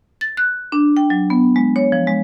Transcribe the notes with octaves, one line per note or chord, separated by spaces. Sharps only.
A6
F#6
D4
G5
F#3
B3
G#3
C#5
F3
G#3